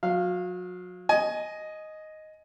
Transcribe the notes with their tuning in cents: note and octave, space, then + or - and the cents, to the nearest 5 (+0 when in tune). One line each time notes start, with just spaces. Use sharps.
F#3 -35 F5 -5
D#5 +0 G#5 +20